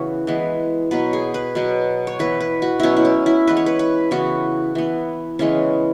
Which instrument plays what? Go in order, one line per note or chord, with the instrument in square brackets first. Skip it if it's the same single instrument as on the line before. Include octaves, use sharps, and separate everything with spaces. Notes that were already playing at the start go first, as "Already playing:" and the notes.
Already playing: [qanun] C#3 E3 B3 F#4
E3 G#3 B3
B2 F#3 B3 B4
G#4
B4
B2 F#3 B3
C#5
E3 B3 B4
B4
F#4
B2 F#3 B3 C#4 E4
E4
C#4
E4
E3 G#3 B3 B4
C#5
B4
B4
C#3 E3 B3 F#4
E3 B3
C#3 E3 G#3 B3 C#4